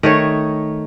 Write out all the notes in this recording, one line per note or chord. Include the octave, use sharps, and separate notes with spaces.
D#3 A3 C#5